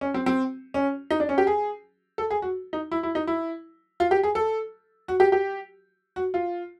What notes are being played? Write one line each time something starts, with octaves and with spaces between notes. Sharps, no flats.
C#4
C4
C4
C#4
D#4
D4
C#4
G4
G#4
A4
G#4
F#4
D#4
E4
E4
D#4
E4
F4
G4
G#4
A4
F#4
G4
G4
F#4
F4